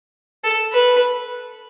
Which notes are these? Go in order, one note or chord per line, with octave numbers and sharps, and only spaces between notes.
A4
B4